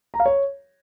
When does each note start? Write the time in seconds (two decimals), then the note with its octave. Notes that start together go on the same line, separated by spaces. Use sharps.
0.14 A#5
0.20 F5
0.26 C#5